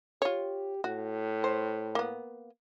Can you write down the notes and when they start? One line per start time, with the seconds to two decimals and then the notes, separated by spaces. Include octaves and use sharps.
0.22 F4 G4 C#5
0.84 A2 F#4
1.44 C5
1.95 A#3 B3